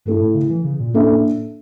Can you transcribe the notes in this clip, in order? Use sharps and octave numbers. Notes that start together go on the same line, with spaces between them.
G2 A3 E4 A4
A2
C#3
E3
C#3
A#2
A2 A#3 D4 A4 E5